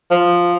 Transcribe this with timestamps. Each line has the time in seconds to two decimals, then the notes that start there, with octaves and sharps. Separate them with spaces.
0.11 F3